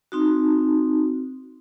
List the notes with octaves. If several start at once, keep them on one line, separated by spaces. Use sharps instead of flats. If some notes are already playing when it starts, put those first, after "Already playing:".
C4 D#4 F#4